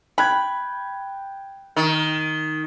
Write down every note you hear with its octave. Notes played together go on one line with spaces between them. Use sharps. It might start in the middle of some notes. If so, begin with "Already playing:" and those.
G5 B5 F#6 G#6
D#3